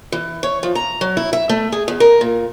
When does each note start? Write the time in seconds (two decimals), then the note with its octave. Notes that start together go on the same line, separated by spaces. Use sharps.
0.12 E3
0.43 C#5
0.63 F3
0.75 A#5
1.01 F#3
1.17 E4
1.33 E5
1.49 A3
1.72 G#4
1.88 E2
2.00 A#4
2.21 A#2